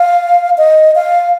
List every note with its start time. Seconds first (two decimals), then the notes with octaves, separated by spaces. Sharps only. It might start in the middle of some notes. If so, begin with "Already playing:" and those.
Already playing: F5
0.58 D#5
0.95 F5